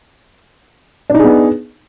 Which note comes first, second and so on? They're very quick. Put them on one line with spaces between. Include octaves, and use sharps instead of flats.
D4 D#4 G#4 B3